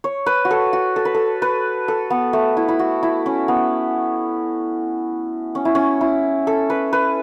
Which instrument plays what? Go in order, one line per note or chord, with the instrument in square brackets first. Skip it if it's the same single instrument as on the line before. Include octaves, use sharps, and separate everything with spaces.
[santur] C#5
B4
F#4
A4
F#4
A4
B4
A4
B4
A4
B3
A3
E4
E4
F#4
E4
C#4
B3
C#4
E4
C#4
E4
A4
B4
B4